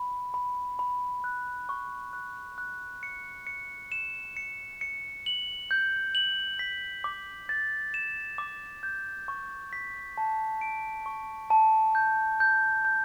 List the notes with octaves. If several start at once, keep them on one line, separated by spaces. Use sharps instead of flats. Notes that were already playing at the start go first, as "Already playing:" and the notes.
Already playing: B5
B5
B5
F#6
C#6
F#6
F#6
C#7
C#7
E7
C#7
C#7
F#7
G6
F#7
B6
D6
A6
E7
D6
G6
C#6
B6
A5
D7
C#6
A5
G6
G6
G6